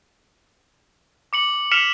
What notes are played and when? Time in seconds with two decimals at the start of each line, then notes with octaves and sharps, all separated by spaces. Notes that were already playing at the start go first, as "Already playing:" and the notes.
1.33 D6 C#7 F#7
1.72 F6 B6 C#7 E7 F7